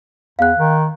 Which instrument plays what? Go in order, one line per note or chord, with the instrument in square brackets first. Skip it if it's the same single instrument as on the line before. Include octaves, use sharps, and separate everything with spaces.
[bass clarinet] E2 [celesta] F5 F#6
[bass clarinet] D#3